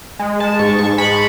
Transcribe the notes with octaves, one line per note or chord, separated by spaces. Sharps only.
G#3
G#3 A5
G#2 C#6
G#2 C#6
G#3 B5